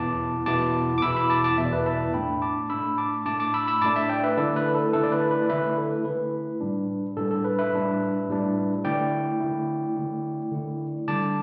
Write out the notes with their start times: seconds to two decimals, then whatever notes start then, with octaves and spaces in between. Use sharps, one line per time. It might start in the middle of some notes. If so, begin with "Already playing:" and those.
Already playing: E2 B2 B3 E4 A5 D6
0.46 E2 B2 B3 E4 A5 D6
0.98 D6
1.02 E2 B2 B3 E4 B5 E6
1.16 B5 E6
1.30 A5 D6
1.44 A5 D6
1.58 E2 B2 B3 E4 E5
1.65 D5
1.72 B4 E5
1.86 E5 A5
2.14 A2 A3 D4 G5 B5
2.42 A5 D6
2.70 A2 A3 D4 B5 E6
2.98 A5 D6
3.26 A2 A3 D4 A5 D6
3.40 A5 D6
3.54 B5 E6
3.67 B5 E6
3.81 A2 A3 D4 A5 D6
3.96 E5 A5
4.10 D5 G5
4.24 B4 E5
4.37 D3 A3 E4 A4 D5
4.56 B4
4.75 A4
4.93 D3 A3 E4 A4
5.03 D5
5.12 B4
5.31 B4
5.42 D5
5.49 D3 A3 E4 B4 E5
5.77 A4
6.05 D3 A3 E4 B4
6.60 A2 G3 D4
7.17 A2 G3 D4 A4
7.31 A4
7.44 B4
7.59 B4 E5
7.73 A2 G3 D4
8.29 A2 G3 D4
8.84 D3 A3 E4 D5 G5
9.40 D3 A3 E4
9.96 D3 A3 E4
10.52 D3 A3 E4
11.08 D3 G3 D4 A5 D6